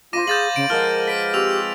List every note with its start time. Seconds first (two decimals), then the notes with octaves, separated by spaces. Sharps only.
0.13 F4 C5 F5 B5 D6 A#6 D#7
0.27 G#4 F5 G6 A6 F#7
0.56 C#3 D7
0.70 F3 G#3 A#4 F#5 F6
1.08 B4 B6 D7
1.34 C4 F4 G4 C#5 E6 F7